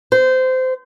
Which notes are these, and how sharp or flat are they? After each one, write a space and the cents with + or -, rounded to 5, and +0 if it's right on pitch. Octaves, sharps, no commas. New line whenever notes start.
C5 -20